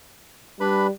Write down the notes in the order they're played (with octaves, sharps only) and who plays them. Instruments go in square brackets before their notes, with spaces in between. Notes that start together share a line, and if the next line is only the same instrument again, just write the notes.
[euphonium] G3 [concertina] D4 B4 B5